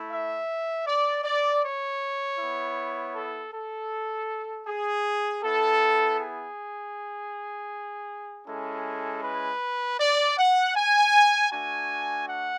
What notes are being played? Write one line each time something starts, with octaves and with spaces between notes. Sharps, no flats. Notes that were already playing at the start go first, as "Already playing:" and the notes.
Already playing: A3 E4
E5
D5
D5
C#5
B3 E4
A4
A4
G#4
B3 E4 A4
G#4
G#3 C#4 E4 A4
B4
D5
F#5
G#5
A3 D4 F#4 G#5
F#5